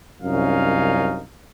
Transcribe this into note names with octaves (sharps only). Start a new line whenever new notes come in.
C2 F#2 C#4 D#4 F5